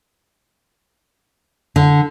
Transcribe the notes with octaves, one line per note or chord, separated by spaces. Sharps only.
D3